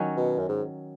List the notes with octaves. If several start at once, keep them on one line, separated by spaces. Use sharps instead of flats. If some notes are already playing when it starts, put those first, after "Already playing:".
Already playing: D#3 F#3 C#4
B2
F#2
G#2